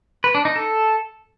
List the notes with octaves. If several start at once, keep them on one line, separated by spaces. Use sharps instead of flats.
B4
D4
D#4
A4